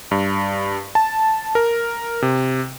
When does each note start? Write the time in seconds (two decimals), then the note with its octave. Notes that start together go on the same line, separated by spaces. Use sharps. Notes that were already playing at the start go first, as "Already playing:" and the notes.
0.11 G2
0.95 A5
1.55 A#4
2.22 C3